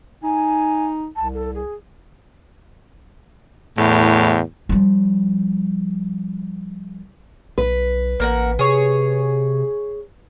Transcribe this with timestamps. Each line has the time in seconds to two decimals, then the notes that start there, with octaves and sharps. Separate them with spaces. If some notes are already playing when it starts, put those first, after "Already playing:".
0.24 D#4 G#5
1.16 C2 A5
1.35 A4
1.55 G#4
3.78 E2 A2
4.69 F3 G3
7.58 B1 B4
8.20 A1 A#3 A#4 F#5
8.59 C3 G#4 C#5